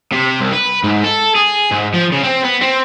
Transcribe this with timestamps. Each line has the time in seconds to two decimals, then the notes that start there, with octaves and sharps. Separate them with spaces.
0.12 C3
0.40 C2
0.52 B4
0.84 G#2
1.04 A4
1.35 G#4
1.71 G#2
1.94 F3
2.12 C#3
2.24 C4
2.44 B3
2.62 C4